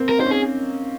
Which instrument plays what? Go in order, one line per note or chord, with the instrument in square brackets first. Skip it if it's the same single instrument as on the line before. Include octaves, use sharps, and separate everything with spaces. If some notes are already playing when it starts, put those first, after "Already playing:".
Already playing: [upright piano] A#3 C4
[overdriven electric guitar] A#4
[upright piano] D#4 [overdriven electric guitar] C5
[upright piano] C#4
[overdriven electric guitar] G#4